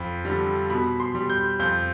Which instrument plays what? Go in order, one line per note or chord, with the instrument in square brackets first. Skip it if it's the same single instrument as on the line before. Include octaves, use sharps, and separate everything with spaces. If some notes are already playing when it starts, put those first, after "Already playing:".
Already playing: [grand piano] F2 B5
D3 G3
B2 B5
C6
G3
G6
F2 G6